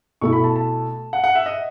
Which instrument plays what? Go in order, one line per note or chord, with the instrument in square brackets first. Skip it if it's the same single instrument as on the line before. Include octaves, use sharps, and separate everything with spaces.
[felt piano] B2 A3 E4 [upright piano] C#6
[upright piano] B5
A5
A5
F#5
F#5
E5
D#5